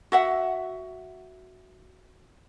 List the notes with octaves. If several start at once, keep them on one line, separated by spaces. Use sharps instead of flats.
F#4 E5 F#5